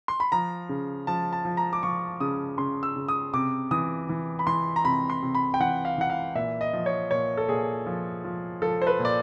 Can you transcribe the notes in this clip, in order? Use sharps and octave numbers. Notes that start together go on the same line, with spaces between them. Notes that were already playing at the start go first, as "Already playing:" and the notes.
C6
B5
F3 A#5
C#3
F3 A5
A5
F3
A#5
D6
F3 C#6
C#3 D#6
C#3 C6
E6
C#3
D#6
C3 D6
E3 D#6
E3
B5
E3 C6
A#5
C3 B5
C6
C3
B5
G5
E3 F#5
F5
E3 F#5
F5
A#2 E5
D#5
F3
C#5
A#2 C#5
A4
A#2 G#4
F3
F3
F3 A4
C5
B4
A#2
D5